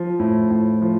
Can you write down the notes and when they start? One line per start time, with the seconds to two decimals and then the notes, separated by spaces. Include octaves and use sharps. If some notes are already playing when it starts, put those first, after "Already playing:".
Already playing: F3
0.19 A2
0.50 A2
0.82 F3